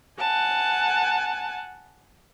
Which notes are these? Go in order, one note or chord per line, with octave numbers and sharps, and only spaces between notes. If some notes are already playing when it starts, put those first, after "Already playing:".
F#5 G#5 A5